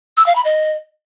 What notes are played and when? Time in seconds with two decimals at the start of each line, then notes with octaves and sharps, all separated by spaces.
0.17 E6
0.26 F5
0.36 B5
0.45 D#5